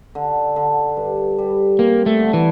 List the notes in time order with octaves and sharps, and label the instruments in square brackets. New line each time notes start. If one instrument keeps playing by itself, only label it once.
[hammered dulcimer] D3
D3
G2
G3
[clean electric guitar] A#3 [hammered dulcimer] C4
[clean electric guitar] A3
[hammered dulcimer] D3
[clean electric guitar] E3